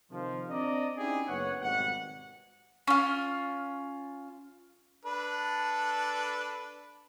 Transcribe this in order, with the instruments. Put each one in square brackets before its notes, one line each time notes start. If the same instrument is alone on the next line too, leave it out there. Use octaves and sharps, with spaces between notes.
[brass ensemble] C3 D#3 F3
C4 D4 D5 D#5 A#5
C#4 D#4 E4 G4 G#4
F#1 B3 C#5 F#5
G#1 B2 G3 F#5
[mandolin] C#4 F4
[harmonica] D4 A4 B4